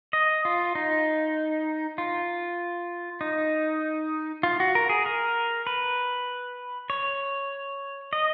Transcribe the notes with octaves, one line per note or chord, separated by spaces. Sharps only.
D#5
F4
D#4
F4
D#4
F4
F#4
A#4
G#4
A#4
B4
C#5
D#5